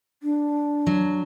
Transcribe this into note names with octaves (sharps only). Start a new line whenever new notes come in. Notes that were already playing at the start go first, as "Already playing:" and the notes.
D4
F#3